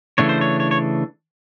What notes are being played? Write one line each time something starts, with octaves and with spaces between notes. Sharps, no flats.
C#3 E3 A3 D4 C#5
C5
C#5
C#5
C#5